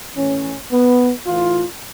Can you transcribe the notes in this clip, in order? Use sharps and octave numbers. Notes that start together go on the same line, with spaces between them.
A2 E3 C#4
B3
A2 E3 F4